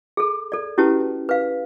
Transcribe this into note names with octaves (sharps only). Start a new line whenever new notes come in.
G#4 A4
A4 D5
C#4 E4 F#4 G4 B4 A5
B4 F5